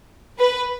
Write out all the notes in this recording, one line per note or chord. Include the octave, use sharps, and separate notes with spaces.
B4